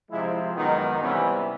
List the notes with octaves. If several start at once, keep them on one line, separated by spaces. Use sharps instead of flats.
C3 F3 G#3 E4
F#2 D#3 G#3 B3 D#4
C3 E3 G3 B3 C#4